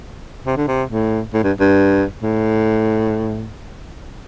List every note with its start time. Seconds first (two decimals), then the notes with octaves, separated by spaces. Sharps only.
0.46 C3
0.57 D3
0.67 C3
0.90 A2
1.34 A2
1.43 G2
1.60 G2
2.23 A2